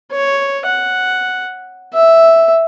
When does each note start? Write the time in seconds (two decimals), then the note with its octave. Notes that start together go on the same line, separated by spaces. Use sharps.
0.12 C#5
0.66 F#5
1.93 E5